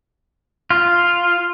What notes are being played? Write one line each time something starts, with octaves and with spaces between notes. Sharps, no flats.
F4